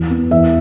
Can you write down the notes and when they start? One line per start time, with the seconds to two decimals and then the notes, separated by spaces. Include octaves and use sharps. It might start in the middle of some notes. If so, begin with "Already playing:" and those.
Already playing: E2
0.10 B3
0.31 E2 E5